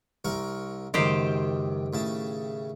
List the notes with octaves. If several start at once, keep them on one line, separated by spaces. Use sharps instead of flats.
C2 A#4 C#6
C#2 F#2 D#3 G4 C5
A2 C#3 A5